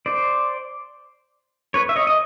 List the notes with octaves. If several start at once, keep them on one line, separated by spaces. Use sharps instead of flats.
C5 D5
B4 C#5
E5
C#5 D#5
D#5